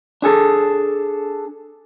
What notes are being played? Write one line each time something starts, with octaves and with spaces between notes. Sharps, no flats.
D4 G#4 A4